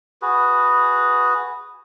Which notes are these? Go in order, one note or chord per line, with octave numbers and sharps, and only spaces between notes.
F#4 G#4 B4